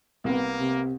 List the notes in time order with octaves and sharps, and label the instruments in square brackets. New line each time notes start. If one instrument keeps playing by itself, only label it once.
[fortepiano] C2 B3 [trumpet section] A#3
[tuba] C3